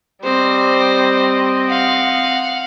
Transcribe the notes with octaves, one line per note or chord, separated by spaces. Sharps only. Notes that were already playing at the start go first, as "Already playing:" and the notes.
G3 C4 C5 D#5
F5 F#5